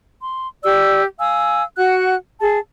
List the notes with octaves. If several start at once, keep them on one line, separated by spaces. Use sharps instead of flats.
C6
G4 D5 E6
F5 G#5 D#6 E6
F#4 F#5 F#6
G#4 A5